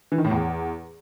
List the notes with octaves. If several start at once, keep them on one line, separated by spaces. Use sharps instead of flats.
E3
D#3
A2
E2